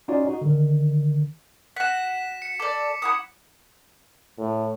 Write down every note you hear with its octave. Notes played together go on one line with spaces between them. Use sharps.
C#4 D#4 F4 F#4 C#5 D5
D#4 F#4
D3 D#3
F#4 F#5 B6 E7
C#7
A4 D5 D6
E4 F#5 D#6
A2